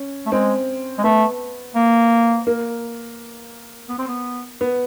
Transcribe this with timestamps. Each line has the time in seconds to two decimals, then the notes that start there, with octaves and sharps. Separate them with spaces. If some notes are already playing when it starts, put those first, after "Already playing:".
Already playing: C#4
0.26 A3
0.32 G#3 C4
0.98 G#3
1.03 A3 B3
1.75 A#3
2.47 A#3
3.89 B3
3.99 C4
4.08 B3
4.61 B3